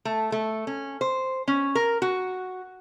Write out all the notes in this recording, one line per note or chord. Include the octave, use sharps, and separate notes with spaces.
A3
A3
C#4
C5
C#4
A#4
F#4